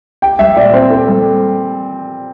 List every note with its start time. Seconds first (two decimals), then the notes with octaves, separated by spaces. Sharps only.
0.22 G4 G5
0.39 G3 E5
0.56 A#2 D5
0.73 C4 C5
0.90 G4 A4
1.08 G3